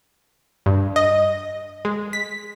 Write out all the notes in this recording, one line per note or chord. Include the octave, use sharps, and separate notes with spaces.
G2
D#5
G#3
B6